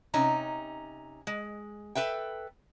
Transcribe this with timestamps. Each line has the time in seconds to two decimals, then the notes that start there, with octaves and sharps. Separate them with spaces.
0.14 C3 C#4 D#4 A#5
1.27 G#3
1.95 A4 B4 E5 G5